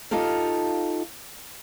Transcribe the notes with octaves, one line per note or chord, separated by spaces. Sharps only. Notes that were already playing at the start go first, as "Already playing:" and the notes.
D#4 F4 G4 A4 F5